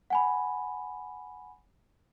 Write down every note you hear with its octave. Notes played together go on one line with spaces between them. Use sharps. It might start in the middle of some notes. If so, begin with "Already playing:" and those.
F#5 G#5 B5